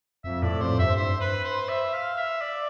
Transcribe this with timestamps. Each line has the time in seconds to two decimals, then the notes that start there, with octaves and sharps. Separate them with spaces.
0.24 F2 E5
0.42 A2 D5
0.61 F2 C5
0.79 G2 E5
0.96 C5
1.21 B4
1.45 C5
1.69 E5
1.93 F5
2.17 E5
2.41 D5